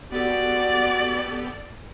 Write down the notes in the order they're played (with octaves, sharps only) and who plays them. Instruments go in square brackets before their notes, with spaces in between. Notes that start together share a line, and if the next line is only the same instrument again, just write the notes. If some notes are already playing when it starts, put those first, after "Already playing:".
[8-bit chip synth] B3 G4 A4 [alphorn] F#4 [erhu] D5